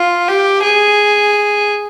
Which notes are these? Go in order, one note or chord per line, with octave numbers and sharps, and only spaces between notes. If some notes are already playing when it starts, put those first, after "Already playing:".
Already playing: F4
G4
G#4